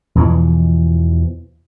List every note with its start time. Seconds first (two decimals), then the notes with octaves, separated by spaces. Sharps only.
0.15 E2 B2 E3 F3